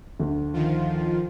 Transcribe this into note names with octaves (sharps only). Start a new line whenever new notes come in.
D2
D#3 F3 F4